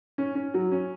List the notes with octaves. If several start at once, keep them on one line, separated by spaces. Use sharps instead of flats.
C#4
C#4
F#3
C#4